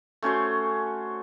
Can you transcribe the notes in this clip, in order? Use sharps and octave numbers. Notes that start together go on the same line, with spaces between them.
A3 C#4 F#4 C5